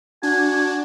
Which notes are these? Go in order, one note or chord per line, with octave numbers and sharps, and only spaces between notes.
D4 F#4 G#5